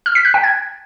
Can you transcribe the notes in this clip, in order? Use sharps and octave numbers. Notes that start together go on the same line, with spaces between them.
F6
B6
F#6
G5
G#6